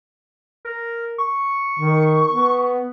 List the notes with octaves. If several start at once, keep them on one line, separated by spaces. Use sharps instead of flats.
A#4
C#6
D#3
B3